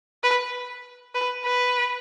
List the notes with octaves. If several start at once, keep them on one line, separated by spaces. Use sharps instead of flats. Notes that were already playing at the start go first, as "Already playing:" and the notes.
B4
B4
B4